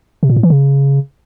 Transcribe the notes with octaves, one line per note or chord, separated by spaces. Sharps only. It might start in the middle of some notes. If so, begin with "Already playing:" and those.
C3
A#2
A2
E3
C#3